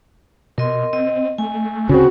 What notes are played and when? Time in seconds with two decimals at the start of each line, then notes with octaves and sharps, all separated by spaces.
0.58 B2 A#4 D#5 C6
0.93 C4 D#5
1.38 A3 G#5
1.89 D2 C#3 C4 F#4